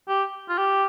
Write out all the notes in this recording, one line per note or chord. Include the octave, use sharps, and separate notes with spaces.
G4
F4
G4